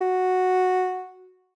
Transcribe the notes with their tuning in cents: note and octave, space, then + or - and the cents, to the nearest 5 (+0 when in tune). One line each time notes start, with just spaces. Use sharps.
F#4 -5